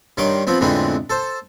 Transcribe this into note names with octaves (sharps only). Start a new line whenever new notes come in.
G2 D#3 C#5 C6 D6
F3 B3 C4
F2 A2 D3 G#3 B3 C4
A4 C5